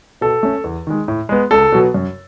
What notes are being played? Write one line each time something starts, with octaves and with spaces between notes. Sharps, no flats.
B2 A4
A3 C#4
E2
D#3 G#3
A2
G#3 B3
C#2 A4
B2 F#3 B3
F#2